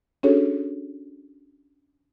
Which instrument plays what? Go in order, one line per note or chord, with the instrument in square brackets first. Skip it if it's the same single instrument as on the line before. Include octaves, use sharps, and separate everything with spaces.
[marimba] C#4 D4 F#4 G#4 A4 C#5